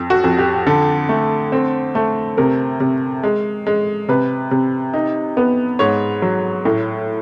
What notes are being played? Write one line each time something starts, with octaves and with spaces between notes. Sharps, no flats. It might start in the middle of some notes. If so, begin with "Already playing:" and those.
Already playing: F2
F#4
F2
G4
D3 A4
A3
C4
A3
C3 A#4
C3
G#3
G#3
C3 B4
C3
D#4
B3
G#2 C#5
F#3
A2